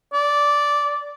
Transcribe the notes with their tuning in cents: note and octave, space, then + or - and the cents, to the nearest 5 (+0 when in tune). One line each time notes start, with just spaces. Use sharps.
D5 -10